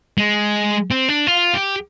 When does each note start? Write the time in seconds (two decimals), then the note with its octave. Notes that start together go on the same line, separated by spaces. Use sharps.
0.18 G#3
0.91 C4
1.08 D4
1.27 F4
1.54 G4